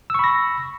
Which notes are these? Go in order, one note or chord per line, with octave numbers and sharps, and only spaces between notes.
B5 C#6 E6 A#6